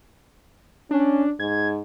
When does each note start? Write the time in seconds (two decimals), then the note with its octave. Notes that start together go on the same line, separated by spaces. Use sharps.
0.91 C#4 D4
1.40 G#2 G#6